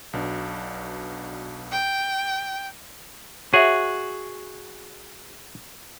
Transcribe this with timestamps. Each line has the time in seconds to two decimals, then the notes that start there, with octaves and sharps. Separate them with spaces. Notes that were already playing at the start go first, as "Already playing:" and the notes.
0.13 B1 B2 D4
1.72 G5
3.54 F#4 G#4 C#5 E5